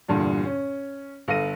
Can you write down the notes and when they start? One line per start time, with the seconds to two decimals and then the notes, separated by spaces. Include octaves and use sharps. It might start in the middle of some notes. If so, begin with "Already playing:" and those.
0.08 E2 G2 A#2 D3
0.45 C#4
1.28 G1 A4 F5 A#6 D#7